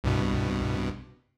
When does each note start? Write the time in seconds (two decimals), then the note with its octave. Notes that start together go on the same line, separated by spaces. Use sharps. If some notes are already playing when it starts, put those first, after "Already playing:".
0.04 C2 G2 B2